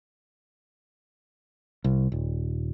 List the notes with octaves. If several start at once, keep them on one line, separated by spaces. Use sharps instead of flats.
C2
D#1